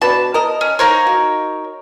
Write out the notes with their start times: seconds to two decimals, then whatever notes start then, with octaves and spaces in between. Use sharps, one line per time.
0.02 B2 D4 B4 A5
0.34 A#4 D#5
0.61 C#4
0.79 D#4 A#4 C5 C#5 F5
1.07 F#4